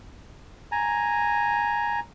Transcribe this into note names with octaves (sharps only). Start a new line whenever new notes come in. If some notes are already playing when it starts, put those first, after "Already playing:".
G#5 A#5